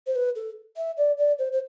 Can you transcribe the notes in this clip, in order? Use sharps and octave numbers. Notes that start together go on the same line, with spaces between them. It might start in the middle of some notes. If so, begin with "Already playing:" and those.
C5
B4
A4
E5
D5
D5
C5
C5